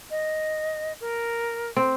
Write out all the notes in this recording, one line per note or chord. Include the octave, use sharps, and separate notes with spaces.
D#5
A#4
C4